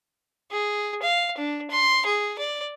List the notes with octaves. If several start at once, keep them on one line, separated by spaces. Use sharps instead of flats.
G#4
F5
D4
C6
G#4
D5